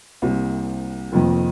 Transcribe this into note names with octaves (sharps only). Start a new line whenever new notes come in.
C2 C3 G3 A#3
F1 F2 D#3 A#3